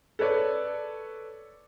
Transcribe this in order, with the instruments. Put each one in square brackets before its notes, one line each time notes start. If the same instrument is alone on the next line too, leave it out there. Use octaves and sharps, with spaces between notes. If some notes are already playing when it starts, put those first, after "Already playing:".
[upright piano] A4 B4 C#5 D5